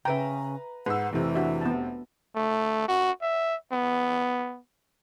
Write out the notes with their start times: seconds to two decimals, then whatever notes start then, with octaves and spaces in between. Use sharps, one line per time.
0.05 C#3 B4 E5 G5 A#5
0.86 G#2 B4 F#5 E6
1.13 F1 C3 E3
1.35 D4 F#4 E5
1.61 B3 A5
2.36 A3
2.88 F#4
3.22 E5
3.72 B3